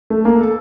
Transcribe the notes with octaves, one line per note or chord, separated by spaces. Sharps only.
A3
A#3
A4